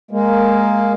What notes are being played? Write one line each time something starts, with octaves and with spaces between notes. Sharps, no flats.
G#3 A#3